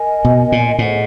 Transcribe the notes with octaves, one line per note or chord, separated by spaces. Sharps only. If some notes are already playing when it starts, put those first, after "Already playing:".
Already playing: A#4 D#5 G#5
B2
A#2
A2 G#4 C5 D#5 F#5